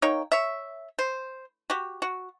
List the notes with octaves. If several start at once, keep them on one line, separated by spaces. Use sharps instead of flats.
A#3 D#4 C#5 G5
C#5 E5
C5
F#4 G4
F#4